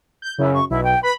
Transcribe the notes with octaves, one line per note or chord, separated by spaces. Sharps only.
G6
F#2 C#3 E4
C#6
B1 E4
G5
B4 B5